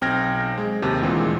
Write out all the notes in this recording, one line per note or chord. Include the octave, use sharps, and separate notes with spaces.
B1 C4 G5 F6 G#6 A#6
G#3
D#2 C3 D#3
D2 A#2 E3 G#3 C4